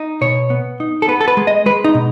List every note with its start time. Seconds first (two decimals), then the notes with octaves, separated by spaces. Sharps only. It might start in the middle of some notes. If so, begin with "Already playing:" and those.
Already playing: D#4
0.21 B2 C#5
0.50 B3
0.80 D#4
1.02 A4
1.08 B3 B4
1.21 A4
1.28 B4
1.37 G#3
1.47 D#5
1.66 G#3 B4
1.84 D#4
1.95 B2